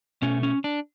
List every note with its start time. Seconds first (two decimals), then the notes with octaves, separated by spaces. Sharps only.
0.22 B2 A3 C#4
0.43 C#4
0.64 D4